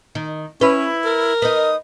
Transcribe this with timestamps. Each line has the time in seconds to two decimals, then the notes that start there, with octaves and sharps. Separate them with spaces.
0.15 D#3
0.61 C#4 E4 B4
1.05 A#4
1.42 D#4 B4 D#6